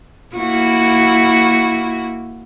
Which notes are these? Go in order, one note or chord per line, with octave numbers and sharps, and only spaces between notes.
A#3 E4 F#4